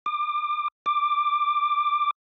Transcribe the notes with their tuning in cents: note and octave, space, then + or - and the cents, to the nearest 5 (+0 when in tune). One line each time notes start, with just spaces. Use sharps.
D6 +30
D6 +10